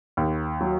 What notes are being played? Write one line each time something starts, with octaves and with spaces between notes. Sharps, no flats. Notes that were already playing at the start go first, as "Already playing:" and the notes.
D#2
F#3